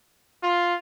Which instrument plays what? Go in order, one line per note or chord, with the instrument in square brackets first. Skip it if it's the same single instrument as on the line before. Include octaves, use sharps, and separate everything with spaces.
[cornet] F4